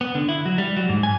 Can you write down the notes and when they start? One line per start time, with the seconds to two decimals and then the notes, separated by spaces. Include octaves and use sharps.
0.01 B3
0.15 D3
0.29 E4
0.45 F#3
0.58 G3
0.77 F#3
0.89 G#2
1.03 G#5